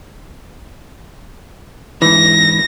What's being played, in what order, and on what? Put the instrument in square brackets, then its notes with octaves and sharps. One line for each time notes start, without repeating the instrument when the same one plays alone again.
[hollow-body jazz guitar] G#2 E3 [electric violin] A#6